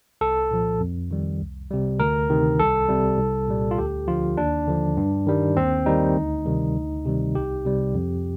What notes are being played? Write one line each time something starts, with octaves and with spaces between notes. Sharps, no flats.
C2 A4
A#2 F3
F2
D#3 G3
C2
C3 G3
D2 A#4
C3 D#3
C2 A4
C3 G3
C2
A#2 G3
F4
D2 G4
D3 F3 F4
D#2 D4
D3 F3
G2
D#3 G3
D#2 C4
D#3 G3 D#4
D2
C3 D#3 G3
D2
C3 D#3 G3
C2 G4
C3 G3
F2